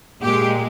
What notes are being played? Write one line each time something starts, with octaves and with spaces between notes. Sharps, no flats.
A#2 G#3 G4